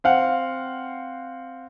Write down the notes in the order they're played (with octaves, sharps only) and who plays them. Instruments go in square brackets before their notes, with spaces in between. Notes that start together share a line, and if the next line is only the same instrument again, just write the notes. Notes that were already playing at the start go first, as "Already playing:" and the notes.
[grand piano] C4 F5 F#5